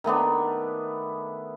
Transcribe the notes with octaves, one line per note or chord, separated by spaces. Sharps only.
D#3 A3 B3 D4